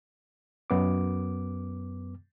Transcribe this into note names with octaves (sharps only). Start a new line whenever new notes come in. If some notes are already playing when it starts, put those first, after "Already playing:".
F#2 B3 D6